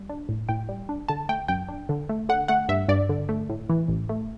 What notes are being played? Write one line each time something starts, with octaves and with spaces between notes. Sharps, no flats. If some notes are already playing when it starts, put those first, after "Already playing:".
Already playing: G3
D4
A2
A2 G5
G3
D4
D3 A5
A3 G5
F#2 G5
D4
D3
A3
D3 F#5
A3 F#5
G2 E5
G2 D5
D3
A3
A2
E3
A1
A3